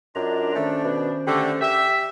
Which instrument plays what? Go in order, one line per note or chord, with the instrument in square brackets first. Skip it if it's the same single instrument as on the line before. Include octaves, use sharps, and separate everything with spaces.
[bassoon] F#2 [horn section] D4 [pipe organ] F4 D#5 A#5
[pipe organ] D#3 C#4 C5 [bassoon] A3
[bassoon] B2
[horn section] D3 A3 [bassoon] G4
[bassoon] G4 [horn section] E5